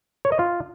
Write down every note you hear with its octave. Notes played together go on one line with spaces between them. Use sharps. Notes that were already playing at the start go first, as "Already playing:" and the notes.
C#5
D#5
F4